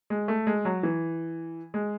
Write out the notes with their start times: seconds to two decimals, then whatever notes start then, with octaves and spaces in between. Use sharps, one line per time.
0.10 G#3
0.28 A3
0.47 G#3
0.65 F#3
0.83 E3
1.74 G#3